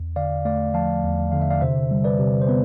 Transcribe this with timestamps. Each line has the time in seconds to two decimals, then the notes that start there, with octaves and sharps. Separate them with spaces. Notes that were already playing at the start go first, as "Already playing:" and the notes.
Already playing: E2
0.16 D3 D5 F5
0.45 A3 D5 F5
0.74 F3 F5 A5
1.04 E2
1.32 D3 F5
1.42 E5
1.51 D5 F5
1.61 C3 C5 E5
1.91 G3
2.04 B4 D5
2.19 C3
2.42 C5
2.49 B3 B4